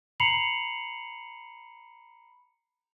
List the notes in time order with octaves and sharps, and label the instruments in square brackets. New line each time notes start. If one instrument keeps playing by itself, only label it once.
[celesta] A#5 B5 C7 C#7 F7 F#7